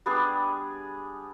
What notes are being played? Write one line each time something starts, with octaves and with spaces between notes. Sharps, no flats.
G3 B3 D4 G#4